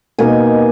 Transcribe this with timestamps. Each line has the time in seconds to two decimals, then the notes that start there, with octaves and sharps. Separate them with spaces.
0.19 B2 A#3 D#4 G#5